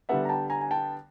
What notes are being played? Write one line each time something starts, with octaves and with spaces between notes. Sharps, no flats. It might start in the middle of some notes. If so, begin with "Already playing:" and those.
D3 G3 B3 E5 F#5
A#5
G5 A5
G#5 A#5
G#5
G5 A5